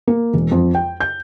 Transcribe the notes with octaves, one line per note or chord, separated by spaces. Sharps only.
A#3
E1
F2
G5
G6